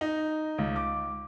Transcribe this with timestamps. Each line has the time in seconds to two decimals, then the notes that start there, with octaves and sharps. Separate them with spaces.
0.01 D#4
0.58 C#2
0.76 D6